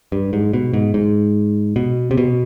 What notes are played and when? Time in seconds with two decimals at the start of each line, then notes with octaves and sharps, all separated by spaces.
0.12 G2
0.33 G#2
0.53 B2
0.73 G#2
0.94 G#2
1.76 B2
2.11 C3
2.18 B2